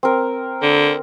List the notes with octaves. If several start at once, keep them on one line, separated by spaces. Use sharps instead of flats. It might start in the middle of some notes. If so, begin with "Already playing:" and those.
C4 A#4
D3